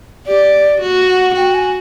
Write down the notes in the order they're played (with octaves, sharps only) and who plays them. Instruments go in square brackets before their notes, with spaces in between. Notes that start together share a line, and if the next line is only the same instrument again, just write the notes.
[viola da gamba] G4 [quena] D5
[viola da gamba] F#4
[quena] F#5
[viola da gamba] F#4 [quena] G5
[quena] G#5